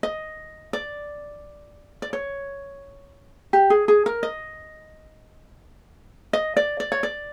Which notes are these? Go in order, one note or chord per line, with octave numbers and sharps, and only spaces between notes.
D#5
D5
D5
C#5
G4
G#4
G#4
A#4
D#5
D#5
D5
D5
C#5
D5